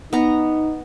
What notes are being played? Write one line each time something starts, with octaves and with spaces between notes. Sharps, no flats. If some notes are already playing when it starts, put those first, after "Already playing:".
B3 D#4 A#5